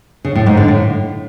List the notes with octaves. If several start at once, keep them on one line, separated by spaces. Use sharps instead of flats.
C#3
A2
G#2
D3
A2